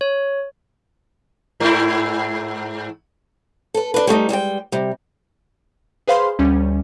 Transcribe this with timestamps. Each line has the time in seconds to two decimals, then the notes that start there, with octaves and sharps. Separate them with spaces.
0.01 C#5
1.60 G#2 E4
3.74 A4 B4
3.94 D4 B4
4.07 G3 A3 D4 D#4
4.29 G3 G#3 D5 G5
4.72 C3 G3
6.07 G#4 B4 C5 F5 B5 C6
6.39 D2 G3 C#4